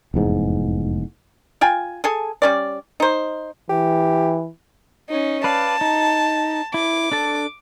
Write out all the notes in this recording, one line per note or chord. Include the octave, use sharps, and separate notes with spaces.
F1 E2 G#2
F4 G5 G#5
G#4 A4 G#5
G3 C#4 D5
D#4 C5
E3 G4
C#4 D#4
B4 D5 F5 A5
D#4
E4 D6
D4 A4 A5